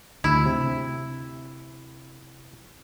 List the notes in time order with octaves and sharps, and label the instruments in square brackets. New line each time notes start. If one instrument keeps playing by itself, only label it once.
[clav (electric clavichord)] D2 [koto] E4
[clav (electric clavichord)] C3